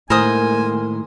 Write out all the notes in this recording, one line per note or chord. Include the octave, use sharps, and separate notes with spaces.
A2 D#3 G#3 A#3 A#4 C5 G#5 D#6